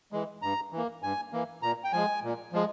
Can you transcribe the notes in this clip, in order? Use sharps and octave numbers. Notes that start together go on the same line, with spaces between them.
E3 G#3
G2 A#5
E3
A#3
G2 G#5
E3 A#3
A#2 A#5
G5
F3 G#3 G#5
A#2
F3 G#3